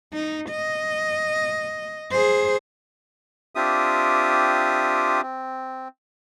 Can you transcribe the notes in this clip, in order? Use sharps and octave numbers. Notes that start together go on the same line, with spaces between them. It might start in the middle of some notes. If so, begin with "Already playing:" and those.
D#4
D#5
G#4 C5
C4 D4 F4 G4 E5 D#6
C4